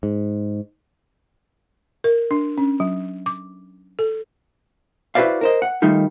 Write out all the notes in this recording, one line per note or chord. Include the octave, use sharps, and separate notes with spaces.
G#2
A#4
D4
C#4
F#3
D6
A4
E4 F#4 B4 C5 D5 F5
A#4 C5 D#5
F#5
D#3 G3 A3 D#4 F4